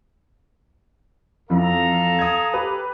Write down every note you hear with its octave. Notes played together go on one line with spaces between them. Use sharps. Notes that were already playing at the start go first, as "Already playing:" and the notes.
F2 E3 A4 F5 A#5
D#6 G#6
G4 B4